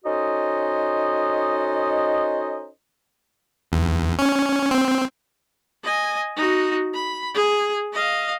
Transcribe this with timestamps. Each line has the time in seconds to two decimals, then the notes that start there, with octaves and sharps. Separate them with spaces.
0.05 C#4 D#4 F#4 A4 C5 D#5
3.72 E2
4.19 C#4
4.71 C4
5.84 D#5 G#5
6.37 D#4 F#4
6.94 B5
7.34 G#4
7.93 D#5 F5